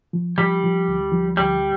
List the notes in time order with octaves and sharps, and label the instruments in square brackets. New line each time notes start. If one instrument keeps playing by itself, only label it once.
[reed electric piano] F3
[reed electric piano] F3 [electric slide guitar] G3
[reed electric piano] F3
D2
F3
[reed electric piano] D2 [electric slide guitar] G3